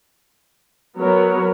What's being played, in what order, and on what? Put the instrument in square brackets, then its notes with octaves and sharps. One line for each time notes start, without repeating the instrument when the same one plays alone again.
[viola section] F#3 B3 F#4 A#4 C#5